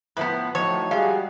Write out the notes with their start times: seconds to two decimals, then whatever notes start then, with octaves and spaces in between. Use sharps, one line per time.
0.17 A2 F3 B3 B4
0.55 A2 F3 F#3 D#4 C#5
0.91 G3 G#3 F#4 G#4 F5